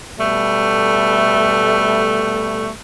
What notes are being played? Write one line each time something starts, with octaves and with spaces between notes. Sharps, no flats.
B2 G3 A3